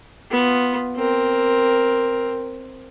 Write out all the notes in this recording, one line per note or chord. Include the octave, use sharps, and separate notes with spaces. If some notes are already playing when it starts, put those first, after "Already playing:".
B3 F4
C4 A#4